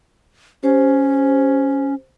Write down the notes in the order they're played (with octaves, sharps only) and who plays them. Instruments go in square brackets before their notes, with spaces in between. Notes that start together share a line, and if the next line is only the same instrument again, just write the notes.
[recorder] C#4 [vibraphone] G4 C5